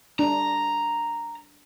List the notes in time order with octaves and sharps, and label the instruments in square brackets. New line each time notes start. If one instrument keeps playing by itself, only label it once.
[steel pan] D4 [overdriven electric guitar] A#5